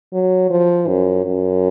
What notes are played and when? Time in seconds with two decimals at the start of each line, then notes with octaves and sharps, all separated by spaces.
0.13 F#3
0.50 F3
0.88 F#2
1.25 F#2